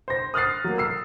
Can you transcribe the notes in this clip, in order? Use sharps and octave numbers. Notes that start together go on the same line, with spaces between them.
C5 A#6
D#6 F6 F#6 A6 C7
F#3 A#3
E6 C7